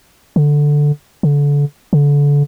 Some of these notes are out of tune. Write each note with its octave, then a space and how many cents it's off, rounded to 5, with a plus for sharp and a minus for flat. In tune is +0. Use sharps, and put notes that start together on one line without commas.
D3 +0
D3 -30
D3 -30